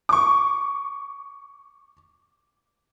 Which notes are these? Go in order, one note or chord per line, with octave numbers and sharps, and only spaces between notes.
C#6 D6